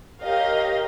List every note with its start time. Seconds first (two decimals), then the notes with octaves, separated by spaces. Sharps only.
0.20 G4 A#4 C#5 D#5 F5